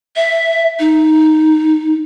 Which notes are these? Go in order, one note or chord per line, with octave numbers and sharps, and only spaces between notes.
E5
D#4